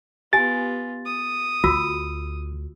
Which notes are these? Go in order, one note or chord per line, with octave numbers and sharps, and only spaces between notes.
B3 F4 G4 G#5 A6
D#6
D2 F4 F#4 E6